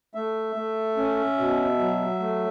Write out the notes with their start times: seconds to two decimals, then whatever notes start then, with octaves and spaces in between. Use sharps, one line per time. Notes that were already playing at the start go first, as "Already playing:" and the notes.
0.15 A3 E5
0.56 A3
0.97 C#4
1.38 B2
1.79 F#3
2.20 A3